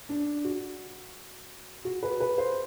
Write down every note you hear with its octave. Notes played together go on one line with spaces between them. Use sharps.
D4
F#4
F#4
B4
B4
C5